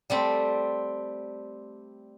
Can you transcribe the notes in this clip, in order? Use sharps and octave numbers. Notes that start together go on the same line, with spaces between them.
G3 A3 C4